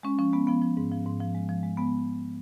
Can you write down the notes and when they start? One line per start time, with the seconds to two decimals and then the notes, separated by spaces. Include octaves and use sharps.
0.03 G#3 C#4
0.18 F3 C#4
0.33 G#3 B3
0.47 F3 B3
0.61 F3
0.77 G#2
0.91 F3
1.06 G#2
1.21 F3
1.34 G#3
1.49 F3
1.63 G#3
1.77 G#3 B3